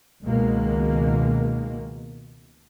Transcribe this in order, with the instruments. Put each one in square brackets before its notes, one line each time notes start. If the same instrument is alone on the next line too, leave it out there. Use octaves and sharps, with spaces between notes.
[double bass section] C#2 B2 D#3 G#3 A#3